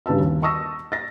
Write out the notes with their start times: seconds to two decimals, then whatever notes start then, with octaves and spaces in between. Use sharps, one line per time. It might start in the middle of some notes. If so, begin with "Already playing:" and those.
0.06 G2 C#3 B4 A5 E6
0.20 D#2
0.42 A5 C#6 D#6 E6 A#6
0.92 A6 A#6